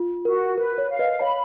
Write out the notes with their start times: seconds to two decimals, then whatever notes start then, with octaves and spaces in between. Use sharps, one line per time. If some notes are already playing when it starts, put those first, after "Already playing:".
Already playing: F4
0.25 F#4 A#4
0.57 A#4 B4
0.78 C#5
0.89 F5
0.99 B4 D#5
1.20 C#5 F5 B5